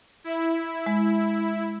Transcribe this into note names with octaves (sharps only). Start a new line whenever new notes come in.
E4
G#3